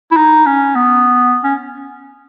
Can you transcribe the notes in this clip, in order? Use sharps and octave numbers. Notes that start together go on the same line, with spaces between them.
E4
D#4
C#4
B3
C#4